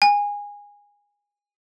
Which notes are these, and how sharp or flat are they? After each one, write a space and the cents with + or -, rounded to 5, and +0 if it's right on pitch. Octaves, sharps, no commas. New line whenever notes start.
G#5 -20